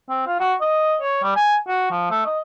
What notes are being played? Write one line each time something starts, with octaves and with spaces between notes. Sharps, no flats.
C4
F4
F#4
D#5
C#5
G3
G#5
F#4
F3
A3
D#5